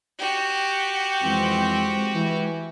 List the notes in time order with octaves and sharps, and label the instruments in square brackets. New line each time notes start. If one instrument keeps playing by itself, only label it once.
[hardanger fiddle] F#4 G4
[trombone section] F2 E3 C4 [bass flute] G#3
[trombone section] E3